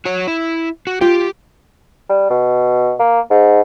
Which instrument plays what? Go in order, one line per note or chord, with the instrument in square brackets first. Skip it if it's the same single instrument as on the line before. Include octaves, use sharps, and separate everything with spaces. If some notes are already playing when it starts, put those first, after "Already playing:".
[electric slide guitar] F#4 C#5
E4
F#4
[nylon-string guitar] F4 G5 [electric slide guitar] G4
[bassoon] G3
B2
A#3
G#2